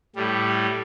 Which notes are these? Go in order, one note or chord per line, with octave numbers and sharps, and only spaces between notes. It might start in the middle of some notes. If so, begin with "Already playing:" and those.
A2 G3